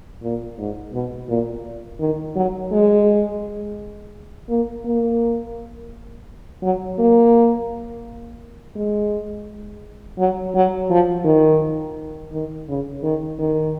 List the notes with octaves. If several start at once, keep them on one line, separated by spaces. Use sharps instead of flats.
A#2
G#2
B2
A#2
D#3
F#3
G#3
A#3
A#3
F#3
A#3
G#3
F#3
F#3
F3
D#3
D#3
C#3
D#3
D#3